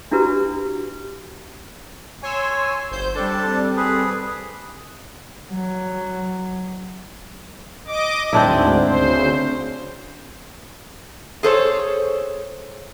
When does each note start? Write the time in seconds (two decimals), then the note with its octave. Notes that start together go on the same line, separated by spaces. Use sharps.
0.11 D4 E4 F#4 G4 A#4 B4
2.23 C#5 G#5 C6 E6
2.91 G1 C5 G6
3.15 G3 C4 D4 A4 A5
3.76 G#4 B4
5.52 F#3
7.87 D#5 D6
8.33 D2 G#2 C4 D4 E4
8.84 D2 C#3 C5
11.43 G#4 A4 C5 C#5